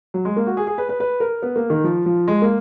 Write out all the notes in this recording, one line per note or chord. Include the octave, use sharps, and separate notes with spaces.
F#3
G#3
A#3
F#4
G#4
G#4
B4
B4
B4
A#4
B3
A#3
D#3
F3
F3
G#3
A#3